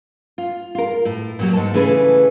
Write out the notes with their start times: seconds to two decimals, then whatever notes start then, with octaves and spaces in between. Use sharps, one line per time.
0.38 F4
0.75 F4 A#4
1.05 A2
1.39 A#2 F#3 G3
1.53 G#2 A5
1.73 C#3 E3 A3 G#4 A4 B4